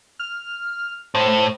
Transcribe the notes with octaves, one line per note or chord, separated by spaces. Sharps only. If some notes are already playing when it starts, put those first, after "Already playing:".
F6
A2 C5